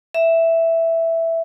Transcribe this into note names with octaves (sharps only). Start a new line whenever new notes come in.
E5